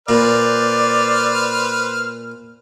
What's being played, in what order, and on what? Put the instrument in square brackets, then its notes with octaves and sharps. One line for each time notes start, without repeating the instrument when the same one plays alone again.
[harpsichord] A#2 [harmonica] B4 C5 F6 [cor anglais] D5